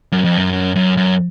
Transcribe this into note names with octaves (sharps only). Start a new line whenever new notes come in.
F#2
F2
F#2
F#2
F#2